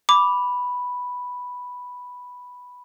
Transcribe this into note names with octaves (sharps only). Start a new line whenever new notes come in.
B5 D6